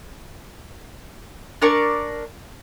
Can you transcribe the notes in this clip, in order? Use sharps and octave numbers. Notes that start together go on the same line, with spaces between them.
D4 A#4 D5 C#6